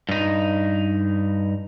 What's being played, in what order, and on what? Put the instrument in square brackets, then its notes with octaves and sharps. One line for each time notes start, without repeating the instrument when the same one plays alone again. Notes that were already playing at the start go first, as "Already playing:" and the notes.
[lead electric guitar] G2 D#4